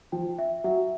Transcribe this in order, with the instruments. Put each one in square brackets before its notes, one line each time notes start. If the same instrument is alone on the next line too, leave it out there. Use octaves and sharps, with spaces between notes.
[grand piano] F3 [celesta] G5
[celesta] E5
[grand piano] F#3 [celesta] E5